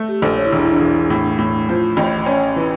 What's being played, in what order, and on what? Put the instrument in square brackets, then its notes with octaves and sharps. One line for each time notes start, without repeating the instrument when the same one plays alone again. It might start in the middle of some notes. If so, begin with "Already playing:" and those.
Already playing: [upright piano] A3
[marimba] G4
[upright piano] A#1 [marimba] A4
[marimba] C#5
E4
[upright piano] E1 [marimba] D4
[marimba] E4
D4
[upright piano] E1
[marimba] E4
[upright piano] A2
A2
F3
A1
[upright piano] C#4 [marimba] D5
[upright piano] E3